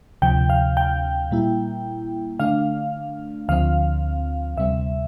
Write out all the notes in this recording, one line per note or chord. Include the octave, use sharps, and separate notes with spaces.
D2 C3 F3 G5
F5
G5
A#2 G3 A#3 E4
D3 A3 D4 F5
D2 D3 F3 C4 F5
D2 C3 G3 C4 E5